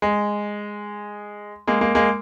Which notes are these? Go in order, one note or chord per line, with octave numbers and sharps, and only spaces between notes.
G#3
G#3 A#3
G#3 A#3
G#3 A#3